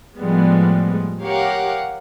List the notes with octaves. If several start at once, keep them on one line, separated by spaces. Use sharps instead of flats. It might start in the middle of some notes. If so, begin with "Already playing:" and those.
A2 F3 G3 G#3 B3
G4 A#4 C#5 F5 F#5